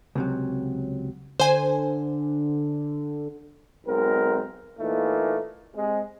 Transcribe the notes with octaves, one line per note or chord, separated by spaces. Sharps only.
C#2 C3 F#3
D3 C5 G#5
B1 G#3 C4 A#4
A#2 E3 A3 A#3 D#4
C3 G#3